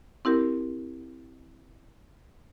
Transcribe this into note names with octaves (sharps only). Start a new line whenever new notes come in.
C4 E4 G4 A#4